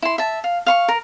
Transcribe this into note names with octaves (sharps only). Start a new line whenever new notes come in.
E4 C6
E5 A5
F5
F5 C6 C#6
A#4